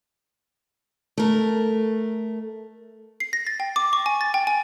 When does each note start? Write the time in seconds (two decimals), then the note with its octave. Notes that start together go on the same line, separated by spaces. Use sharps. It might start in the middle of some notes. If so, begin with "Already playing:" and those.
1.18 A3 A#4
3.20 C7
3.33 A#6
3.47 A6
3.60 G5
3.76 D6
3.93 C#6
4.06 G#5
4.21 A6
4.34 G5
4.47 G#5